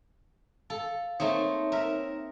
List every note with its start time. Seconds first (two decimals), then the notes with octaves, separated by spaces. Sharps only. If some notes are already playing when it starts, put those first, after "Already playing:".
0.70 A4 F5
1.20 A3 A#3 C4 D#4 C#5
1.72 A#4 E5